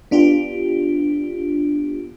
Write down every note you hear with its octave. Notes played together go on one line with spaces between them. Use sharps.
B3 D4 F4 G4